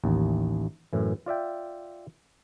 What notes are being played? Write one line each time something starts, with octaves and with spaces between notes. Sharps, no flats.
A1 D#2
F#2 A2 E3
F4 D5 E5 G5